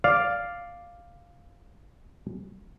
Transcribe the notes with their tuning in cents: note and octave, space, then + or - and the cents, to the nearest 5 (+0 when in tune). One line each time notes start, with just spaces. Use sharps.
D5 +0 F5 +0